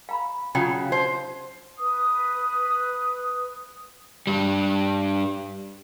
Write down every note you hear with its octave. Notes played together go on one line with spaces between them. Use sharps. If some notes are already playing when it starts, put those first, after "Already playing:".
F5 A#5 B5
C#3 F#3 F4 G5 D#6
F5
D#4 C5
B4 D#6
G2 G3